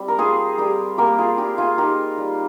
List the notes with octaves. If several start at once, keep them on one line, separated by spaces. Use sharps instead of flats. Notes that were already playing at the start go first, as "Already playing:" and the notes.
Already playing: G3 C4
A#4
F4 G#4 C5
G3 G4 A#4
A#3 G4 A#4
F4 G#4
G3 G4
F4 G#4
D#4 G4 A#4
G3